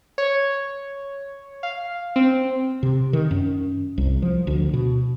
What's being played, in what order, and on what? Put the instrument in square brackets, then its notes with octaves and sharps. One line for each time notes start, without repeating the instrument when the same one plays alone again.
[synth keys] C#5
F5
C4
[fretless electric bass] C3
D#3
F#2
C2
F3
D2
B2